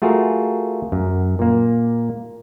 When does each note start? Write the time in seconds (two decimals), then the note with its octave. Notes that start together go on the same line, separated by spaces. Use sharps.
0.02 A3 F4 F#4 G#4 A#4
0.92 F#2
1.39 A#2 A#3